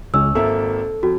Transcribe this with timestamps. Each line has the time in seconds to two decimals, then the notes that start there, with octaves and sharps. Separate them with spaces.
0.14 C#2 C#4 E6
0.35 G#1 A#3 A4 E5
1.03 F2 F#4